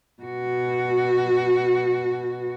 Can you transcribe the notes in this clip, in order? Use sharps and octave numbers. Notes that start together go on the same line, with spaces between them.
B2 F#4